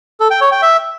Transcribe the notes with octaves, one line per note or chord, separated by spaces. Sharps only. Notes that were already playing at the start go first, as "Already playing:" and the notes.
A4
G5
C#5
G5
E5